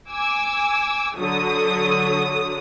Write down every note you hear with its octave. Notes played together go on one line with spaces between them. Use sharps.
G#5 D6 E6
D3 F#3 D#6